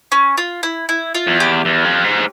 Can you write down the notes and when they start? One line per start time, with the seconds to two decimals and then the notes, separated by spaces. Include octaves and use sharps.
0.12 C#4
0.37 F4
0.63 E4
0.89 E4
1.14 F4
1.27 E2
1.40 G4
1.65 E2
1.84 F2
2.04 G#2